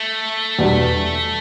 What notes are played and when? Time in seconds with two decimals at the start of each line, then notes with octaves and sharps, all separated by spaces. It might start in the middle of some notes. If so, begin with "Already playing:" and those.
Already playing: A3
0.59 E2 B2 G3 D4